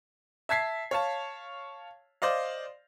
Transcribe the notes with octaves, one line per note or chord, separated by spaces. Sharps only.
E5 A5 G#6 B6 C7
C#5 F5 A5
C5 D5 D#5 F5